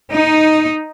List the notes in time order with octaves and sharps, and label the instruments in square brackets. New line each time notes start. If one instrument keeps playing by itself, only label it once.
[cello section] D#4